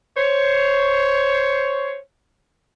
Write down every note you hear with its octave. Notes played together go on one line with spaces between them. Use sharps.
C5 C#5